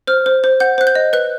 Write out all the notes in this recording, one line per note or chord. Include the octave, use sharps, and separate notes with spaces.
C5 F6
C5
C5
F#5 G6
C5 F#6
G6
D#5
B4 F#6